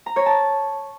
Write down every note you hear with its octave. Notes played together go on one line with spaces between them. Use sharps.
A#5
C#5
A5